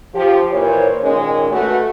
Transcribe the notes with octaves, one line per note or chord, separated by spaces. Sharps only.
F3 G4
A#2 E3 C5 C#5
A#2 D#3 G#3 C#4
A3 F#4 B4